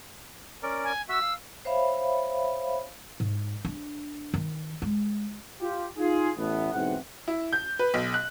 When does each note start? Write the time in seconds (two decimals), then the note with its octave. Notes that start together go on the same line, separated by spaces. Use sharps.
0.63 C#4 A#4 D5
0.84 G#5
1.09 F#4 E5 E6
1.22 F5
1.65 C5 C#5 E5 F5 B5
3.20 G#2
3.65 D4
4.34 D#3
4.82 G#3
5.61 F4 G4
5.97 D#4 F4 G#4
6.36 A1 A3 B3
6.72 B1 G#2 E3 C4 F#5
7.28 E4
7.53 G6
7.79 B4
7.94 B1
8.14 F#6